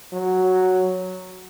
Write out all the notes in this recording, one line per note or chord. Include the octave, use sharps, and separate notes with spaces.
F#3